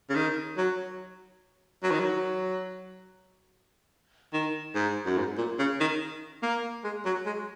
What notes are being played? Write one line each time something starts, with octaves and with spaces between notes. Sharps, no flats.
C#3
D#3
F#3
F#3
D#3
F#3
D#3
G#2
F#2
G#2
A#2
C#3
D#3
A#3
G#3
F#3
G#3